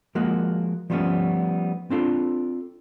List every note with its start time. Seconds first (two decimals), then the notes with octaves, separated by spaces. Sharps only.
0.15 F3 G#3 A#3 F#4
0.90 F3 G3 A3 B3 C#4
1.90 C4 D4 F4 A4